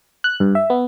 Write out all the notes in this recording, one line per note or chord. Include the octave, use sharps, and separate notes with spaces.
F#6
G2
E5
B3